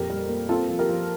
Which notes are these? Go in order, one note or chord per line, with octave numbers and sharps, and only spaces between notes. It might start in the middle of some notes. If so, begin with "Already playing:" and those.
Already playing: F2 A#2 G4 A#4
G3
A#3
C4 F4 A4
F3
G4 A#4
F3